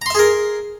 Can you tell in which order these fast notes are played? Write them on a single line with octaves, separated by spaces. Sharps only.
A#5 C6 E5 G#4 A#4